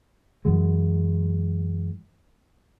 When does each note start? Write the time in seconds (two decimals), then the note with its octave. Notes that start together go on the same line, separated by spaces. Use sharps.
0.45 F#2 E3 F#3 G#3